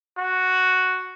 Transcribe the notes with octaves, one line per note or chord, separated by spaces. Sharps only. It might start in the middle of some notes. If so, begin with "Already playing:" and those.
F#4